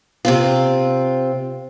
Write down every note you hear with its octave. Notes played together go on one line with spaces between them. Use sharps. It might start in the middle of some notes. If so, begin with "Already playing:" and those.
C3 C4 F4